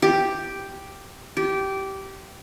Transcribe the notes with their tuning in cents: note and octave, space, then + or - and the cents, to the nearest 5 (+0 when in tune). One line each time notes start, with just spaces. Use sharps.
G4 +0
G4 -15